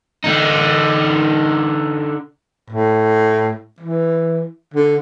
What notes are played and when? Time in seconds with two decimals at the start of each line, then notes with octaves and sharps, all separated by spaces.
0.24 D3 D#4
2.70 A2
3.81 E3
4.74 D3